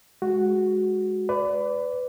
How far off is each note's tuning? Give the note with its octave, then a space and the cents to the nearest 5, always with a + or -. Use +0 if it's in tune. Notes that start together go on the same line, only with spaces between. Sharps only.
G#3 +0 F#4 +0
B4 +25 D5 -15